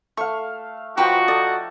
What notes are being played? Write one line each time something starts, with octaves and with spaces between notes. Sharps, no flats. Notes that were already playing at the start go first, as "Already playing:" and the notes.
A3 F5 C#6
F3 D#4 F#4 G4 B4 G5
A4 D5 D#6